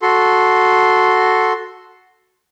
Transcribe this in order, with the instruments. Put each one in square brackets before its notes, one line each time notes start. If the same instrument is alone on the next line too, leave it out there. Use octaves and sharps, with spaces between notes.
[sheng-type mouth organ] F#4 A4 C6